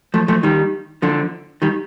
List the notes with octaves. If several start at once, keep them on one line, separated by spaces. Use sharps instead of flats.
F3 A3
F3 A3
D#3 G3
D3 F3
D#3 G3